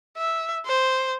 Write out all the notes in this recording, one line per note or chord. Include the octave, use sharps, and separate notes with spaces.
E5
C5